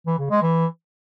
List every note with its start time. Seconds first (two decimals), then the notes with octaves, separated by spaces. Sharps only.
0.07 E3
0.18 C#3
0.30 G#3
0.42 E3